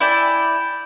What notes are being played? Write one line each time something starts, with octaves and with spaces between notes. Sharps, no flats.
E4 D5 G5 G#5